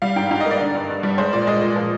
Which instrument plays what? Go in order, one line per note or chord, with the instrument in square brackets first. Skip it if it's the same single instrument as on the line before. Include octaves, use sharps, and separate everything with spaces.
[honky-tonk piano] G3 F5
G#2 G5
G#2 F5
D#5
A#3 D5
D3
G2
G2
G3
G#3 C5
A#2 D5
G#3 D#5
A#2
F3